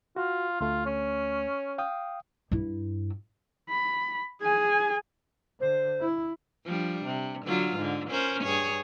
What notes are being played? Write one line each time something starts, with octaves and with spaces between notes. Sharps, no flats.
F4 F#4
D2 A3 F4
C#4
F5 G5 D#6
G2 E4
B5
G#4 G#5
D3 C5
E4
F3 G3 D4
C3
D3 F#3 F4
G#2 D3
C#4 A#4 C5
G2 G#4 C#5